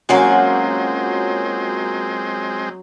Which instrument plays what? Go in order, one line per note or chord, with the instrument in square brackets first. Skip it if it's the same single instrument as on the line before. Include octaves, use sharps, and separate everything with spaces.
[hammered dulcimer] F#3 C#4 [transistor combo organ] G#3 C4 [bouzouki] A#3 F4 F#4